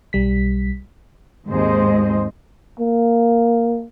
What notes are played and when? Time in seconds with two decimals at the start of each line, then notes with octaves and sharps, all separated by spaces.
0.13 B1 G3 B6
1.48 D#2 G#2 G#3 C4 C5 D#5
2.80 A#3